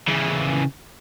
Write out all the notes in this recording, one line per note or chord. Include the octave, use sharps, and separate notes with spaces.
C#3 E3